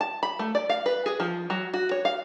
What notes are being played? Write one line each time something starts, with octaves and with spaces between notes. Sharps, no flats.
A5
B5
A3
D5
F5
B4
G#4
F3
F#3
F#4
C#5
F5